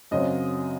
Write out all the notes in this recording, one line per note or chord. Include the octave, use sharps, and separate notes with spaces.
F#2 C#3 F#3 C4 D#5